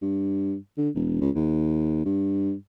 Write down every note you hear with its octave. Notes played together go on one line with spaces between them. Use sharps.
G2
D3
E1
C#2
D#2
G2